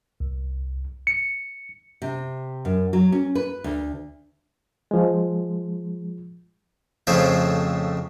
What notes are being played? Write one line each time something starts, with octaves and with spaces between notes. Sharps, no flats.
C2
C#7
C3
F#2
F#3
C#4
B4
D2
F3 G#3
F2 A2 C#3 A3 C5 E5